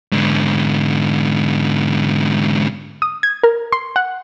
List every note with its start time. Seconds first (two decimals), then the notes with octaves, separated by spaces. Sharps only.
0.12 G#2 D3
3.02 D#6
3.23 G#6
3.43 A#4
3.72 C6
3.96 F#5